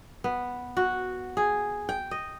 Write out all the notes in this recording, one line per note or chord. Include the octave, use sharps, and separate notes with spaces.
B3
F#4
G#4
G5
D#5